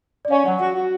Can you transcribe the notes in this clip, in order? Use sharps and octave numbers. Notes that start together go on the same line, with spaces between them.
D5
C#4 F5
F#3 F#5
F#4
F#4